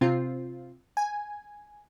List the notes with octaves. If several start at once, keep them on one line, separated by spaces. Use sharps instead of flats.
C3 C4 F4
G#5